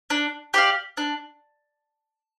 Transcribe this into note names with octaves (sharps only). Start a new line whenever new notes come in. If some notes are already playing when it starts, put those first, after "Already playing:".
D4
G4 D5 F5
D4